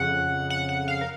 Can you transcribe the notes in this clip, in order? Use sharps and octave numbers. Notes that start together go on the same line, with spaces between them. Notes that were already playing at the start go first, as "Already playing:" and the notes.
Already playing: F2 C#3 F#5
F#5
F#5
F5
A#4